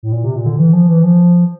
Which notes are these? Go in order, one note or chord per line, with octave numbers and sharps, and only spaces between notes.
A2
A#2
C3
A#2
D3
E3
F3
E3
F3